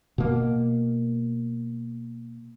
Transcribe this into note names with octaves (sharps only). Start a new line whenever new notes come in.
B2 A#3